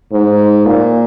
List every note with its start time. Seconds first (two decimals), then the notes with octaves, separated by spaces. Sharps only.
0.12 G#2
0.66 A#2